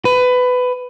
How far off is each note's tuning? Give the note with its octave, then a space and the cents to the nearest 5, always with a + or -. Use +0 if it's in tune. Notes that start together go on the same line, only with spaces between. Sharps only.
B4 +20